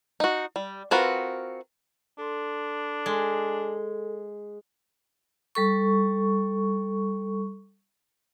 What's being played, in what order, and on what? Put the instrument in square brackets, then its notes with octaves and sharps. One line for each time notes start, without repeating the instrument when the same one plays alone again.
[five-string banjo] D#4 F#4
G3
C4 F4 F#4 A#4 B4
[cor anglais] D4 [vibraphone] A4 C6
[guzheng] G#3 [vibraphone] A4
[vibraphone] G3 A4 C#6